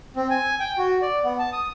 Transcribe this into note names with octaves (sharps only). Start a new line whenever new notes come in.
C4
G#5
G5
F#4
D5
B3
A5
D#6